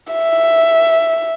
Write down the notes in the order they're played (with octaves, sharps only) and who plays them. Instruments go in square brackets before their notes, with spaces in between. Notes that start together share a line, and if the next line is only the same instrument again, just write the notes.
[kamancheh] E5